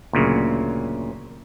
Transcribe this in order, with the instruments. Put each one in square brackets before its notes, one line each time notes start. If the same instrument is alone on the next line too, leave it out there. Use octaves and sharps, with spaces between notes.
[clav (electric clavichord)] D2 A#2 C#3 F#3